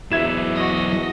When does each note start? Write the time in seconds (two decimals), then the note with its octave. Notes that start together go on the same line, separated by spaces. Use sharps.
0.12 E2 F#3 E4 E5 G#6 E7
0.55 F#4 D#5